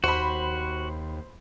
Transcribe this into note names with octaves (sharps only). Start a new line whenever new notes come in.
D#2 F#4 C5 B5